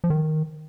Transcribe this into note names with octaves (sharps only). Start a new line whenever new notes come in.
F3
D#3